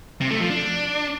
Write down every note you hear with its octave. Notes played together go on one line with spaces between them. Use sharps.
C3
A3
F3
D4